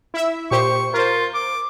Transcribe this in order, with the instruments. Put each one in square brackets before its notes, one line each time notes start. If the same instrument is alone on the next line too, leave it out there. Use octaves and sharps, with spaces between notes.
[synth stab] E4 E5
[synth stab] A#2 G4 C5 [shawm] C#6
[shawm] F4 [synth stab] A#4 C5
[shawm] D6